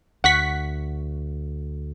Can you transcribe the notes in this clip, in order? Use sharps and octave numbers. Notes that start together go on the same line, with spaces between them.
D2 F#5 C#6 B6